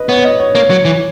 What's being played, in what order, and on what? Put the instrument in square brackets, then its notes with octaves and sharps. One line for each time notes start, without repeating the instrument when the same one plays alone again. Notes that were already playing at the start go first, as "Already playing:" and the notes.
Already playing: [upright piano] B4 D#5
[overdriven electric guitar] B3 [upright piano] C#5
[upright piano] D#5
C#5
[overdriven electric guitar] A#3 [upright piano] C#5
[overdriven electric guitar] F#3
E3